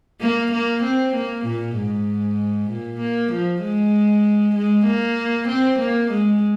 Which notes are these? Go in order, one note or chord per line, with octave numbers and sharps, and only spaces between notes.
A#3
A#3
C4
A#3
A#2
G#2
A#2
A#3
F3
G#3
G#3
A#3
C4
A#3
G#3